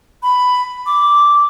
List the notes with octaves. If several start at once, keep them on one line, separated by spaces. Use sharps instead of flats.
B5
D6